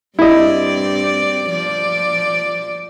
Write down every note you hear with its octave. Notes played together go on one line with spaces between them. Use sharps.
G2 C4 E4 D5 D#5
F3 D5